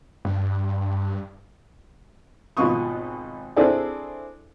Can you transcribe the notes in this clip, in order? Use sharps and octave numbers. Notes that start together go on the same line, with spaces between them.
G2
G#1 B2 B3 F4 C#6 D#6
C4 D4 E4 G#4 A4 D5